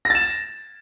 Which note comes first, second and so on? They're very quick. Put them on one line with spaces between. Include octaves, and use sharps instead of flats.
A#6 A6 E7